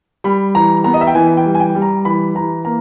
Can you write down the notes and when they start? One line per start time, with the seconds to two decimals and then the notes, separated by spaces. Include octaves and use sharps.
0.24 G3 B5
0.55 E3 A#5
0.84 B3 A#5
0.94 D#5
1.01 E5
1.07 G5
1.15 E3 G#5
1.37 G5
1.45 G3
1.55 G#5
1.60 G5
1.75 G3
1.82 A#5
2.05 E3 B5
2.35 E3 A#5
2.65 A#3 A#5